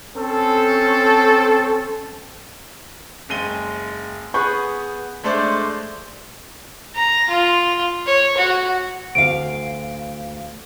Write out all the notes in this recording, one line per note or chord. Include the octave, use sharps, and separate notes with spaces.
C4 C#4 A4
F#1 G#3 D#7 G7
B3 G#4 B5 C#6 F#6 G6
G#3 A3 D4 C5 D5
A#5
F4
C#5
F#4
D2 F5 D7